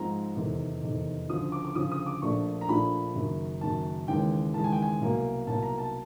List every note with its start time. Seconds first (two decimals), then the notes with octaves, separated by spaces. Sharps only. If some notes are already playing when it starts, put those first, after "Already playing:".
Already playing: G#2 F3 G#3 C4 A#5
0.36 F1 E2 C3 D#3
0.82 F1 E2 C3 D#3
1.30 D2 C#3 F3 D#6
1.52 D6
1.65 D6
1.75 D2 C#3 F3 D#6
1.92 D#6
2.06 D6
2.22 A#1 A#2 F3 A3 D4 C#6
2.61 A#5
2.69 A#1 A#2 F3 A3 D4 B5
3.15 F#1 F#2 D#3
3.61 F#1 F#2 D#3 A5
4.07 D#2 C#3 E3 G#3 G5
4.54 D#2 C#3 E3 G#3 A5
4.64 G#5
4.72 G5
4.82 G#5
5.01 C2 B2 F#3 A#3
5.47 C2 B2 F#3 A#3 A5
5.63 A#5
5.78 A5